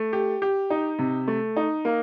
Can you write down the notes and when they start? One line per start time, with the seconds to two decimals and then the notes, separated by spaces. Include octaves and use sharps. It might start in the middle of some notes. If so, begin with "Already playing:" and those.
Already playing: A3
0.13 G4
0.42 G4
0.70 D#4
0.99 C3
1.28 A3
1.57 D#4
1.85 A#3